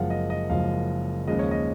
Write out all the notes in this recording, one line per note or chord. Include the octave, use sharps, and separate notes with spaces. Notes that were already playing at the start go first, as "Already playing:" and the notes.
Already playing: F#1 F#2 F3 G#3 F5 F#5
D#5
D#5
F#1 F#2 F3 G#3 F5
D#2 C#3 F3 G#3 D#5
C#5
D#5